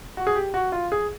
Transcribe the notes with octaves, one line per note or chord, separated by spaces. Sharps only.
F#4
G#4
G4
F#4
F4
G#4